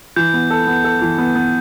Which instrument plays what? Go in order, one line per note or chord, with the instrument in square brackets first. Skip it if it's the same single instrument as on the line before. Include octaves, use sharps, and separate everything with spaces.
[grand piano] E3 [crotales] G6
[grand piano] B3
A4
B3
A4
E3
B3
B3